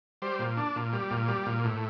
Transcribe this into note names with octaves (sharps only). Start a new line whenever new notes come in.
G3 C5
A#2
D4
A#2
G3
A#2
G3
A#2
A2